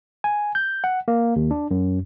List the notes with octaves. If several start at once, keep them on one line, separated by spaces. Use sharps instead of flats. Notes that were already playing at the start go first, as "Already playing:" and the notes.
G#5
G6
F#5
A#3
D#2
D4
F#2